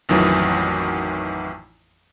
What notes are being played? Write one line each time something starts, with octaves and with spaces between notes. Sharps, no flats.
A1 F2 D#3 E3 F#3